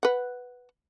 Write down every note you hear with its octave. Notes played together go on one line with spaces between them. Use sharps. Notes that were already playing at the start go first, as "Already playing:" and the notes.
B4 F#5